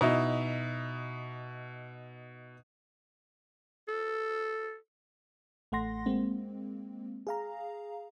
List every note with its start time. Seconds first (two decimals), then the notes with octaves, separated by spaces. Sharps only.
0.01 B2 D#4 E4
3.88 A4
5.72 A1 A3 F#5 C6 A#6
6.06 G#3 A#3 C4
7.27 G#4 F5 A#5